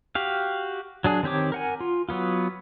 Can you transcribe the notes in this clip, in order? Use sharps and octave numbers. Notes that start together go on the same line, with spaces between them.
F#4 G4 F5
F#3 D4 G#4
D#3 C4 G4 C#5 D6
A#4 F#5 G#5
F4
F#3 B3 F4